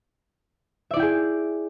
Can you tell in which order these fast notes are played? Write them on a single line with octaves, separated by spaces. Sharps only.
E5 D5 E4 G5 G#4